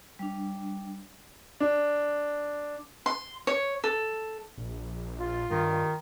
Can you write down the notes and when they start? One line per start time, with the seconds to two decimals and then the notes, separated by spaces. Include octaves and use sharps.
0.19 G3 D4
1.60 D4
3.06 C6
3.47 C#5
3.84 A4
4.57 A#1
5.18 F4
5.51 G2 D#3